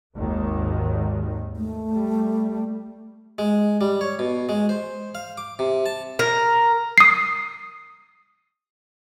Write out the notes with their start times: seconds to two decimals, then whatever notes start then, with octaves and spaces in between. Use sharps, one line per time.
0.15 G#1 D#2 D#3
1.56 A3
1.92 G3
3.38 G#3
3.81 G3
4.01 C#5
4.19 B2
4.49 G#3
4.69 C5
5.15 F5
5.38 D6
5.59 C3
5.86 A5
6.19 A#4
6.98 D#6 C7